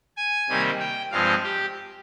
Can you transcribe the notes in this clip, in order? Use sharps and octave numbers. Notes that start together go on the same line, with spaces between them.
G#5
C3 D#3 G3 A#3
G5
G2 F3 G#3 C4 F5
G4